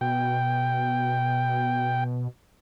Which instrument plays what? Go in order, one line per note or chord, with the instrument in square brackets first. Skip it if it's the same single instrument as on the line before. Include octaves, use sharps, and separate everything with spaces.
[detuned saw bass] B2 [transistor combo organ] G5